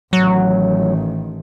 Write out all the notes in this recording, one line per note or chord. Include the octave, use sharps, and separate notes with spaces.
A1 D#3 F#3